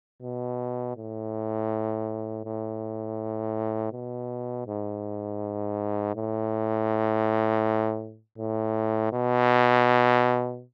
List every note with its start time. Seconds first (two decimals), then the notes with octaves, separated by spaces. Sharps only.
0.22 B2
0.97 A2
2.45 A2
3.93 B2
4.67 G#2
6.16 A2
8.38 A2
9.13 B2